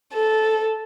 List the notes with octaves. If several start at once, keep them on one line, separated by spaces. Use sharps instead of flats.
A4